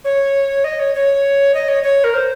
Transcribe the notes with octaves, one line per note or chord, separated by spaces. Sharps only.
C#5
D#5
C#5
C#5
D#5
C#5
C#5
A#4
C5